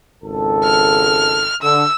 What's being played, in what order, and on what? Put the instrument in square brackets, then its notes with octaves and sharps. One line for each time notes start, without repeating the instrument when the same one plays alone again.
[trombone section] G#1 C#2 A4
[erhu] F6
[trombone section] D3 [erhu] E6